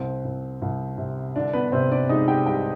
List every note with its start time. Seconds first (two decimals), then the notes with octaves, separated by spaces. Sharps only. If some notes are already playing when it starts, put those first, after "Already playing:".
Already playing: C2 C4
0.25 C2
0.62 C2
0.98 C3
1.36 C2 D3 D4
1.53 B3 B4
1.72 C3 C4 C5
1.91 D4 D5
2.09 G#3 D#4 D#5
2.28 G4 G5
2.46 C2 G4 G5